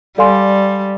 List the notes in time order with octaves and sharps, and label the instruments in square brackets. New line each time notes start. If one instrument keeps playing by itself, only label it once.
[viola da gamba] G3 [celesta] A4 D5 F5 G#5 C6